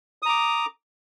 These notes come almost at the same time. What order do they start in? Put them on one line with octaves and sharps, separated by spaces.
D#6 A#5 D6